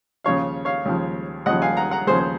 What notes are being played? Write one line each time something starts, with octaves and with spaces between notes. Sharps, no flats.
D#2 C#3 F3 C#5 F5
C#5 F5
D#2 C#3 F3
D#2 C#3 F3 D#5 F#5
F5 G#5
F#5 A#5
F#5 A#5
D#2 C#3 F3 G#4 C5
C5